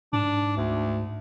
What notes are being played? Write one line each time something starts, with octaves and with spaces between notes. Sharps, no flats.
G#2 D4
D2